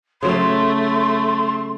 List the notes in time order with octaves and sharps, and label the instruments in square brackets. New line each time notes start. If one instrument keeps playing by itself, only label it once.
[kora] C#3 F#3 [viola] A3 [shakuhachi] C6